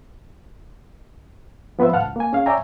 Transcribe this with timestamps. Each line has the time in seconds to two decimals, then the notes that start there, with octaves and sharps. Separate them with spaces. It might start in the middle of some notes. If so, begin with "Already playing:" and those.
1.79 F3 B3 B4 C5 E5
1.92 D#2 A2 F5 F#5 A5 F6
2.04 C#2
2.16 A#3 G#5
2.33 C#4 G#4 F5
2.46 C#5 D5 E5 G5 G#5 A#5